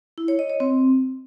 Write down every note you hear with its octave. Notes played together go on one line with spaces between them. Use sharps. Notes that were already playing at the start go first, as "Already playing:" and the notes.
E4
C#5
D#5
C#5
C4